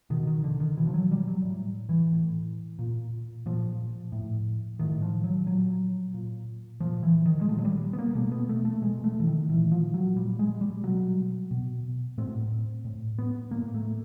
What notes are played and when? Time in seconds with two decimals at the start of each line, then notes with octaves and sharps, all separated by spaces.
0.10 B2 D#3
0.27 D#3
0.44 D3
0.60 D#3
0.77 B2 E3
0.87 F3
0.94 F#3
1.11 G3
1.28 F#3
1.44 A2
1.89 E3
2.12 A2
2.79 A#2
3.46 A#2 F3
4.12 A2
4.79 A2 D#3
5.02 F3
5.24 F#3
5.47 A#2 F#3
6.14 A#2
6.80 A#2 F3
7.03 E3
7.26 D#3
7.41 G#3
7.49 A#2 A3
7.58 F#3
7.65 G3
7.93 B3
7.99 A#3
8.15 B2 A3
8.32 B3
8.49 A3
8.65 A3
8.82 B2 G#3
9.04 A3
9.20 E3
9.27 D#3
9.49 A#2 E3
9.72 F3
9.94 F#3
10.16 A#2 G3
10.39 G#3
10.61 G3
10.83 B2 F#3
11.51 B2
12.18 A2 C4
12.85 A2
13.19 B3
13.51 A2 A#3
13.75 A3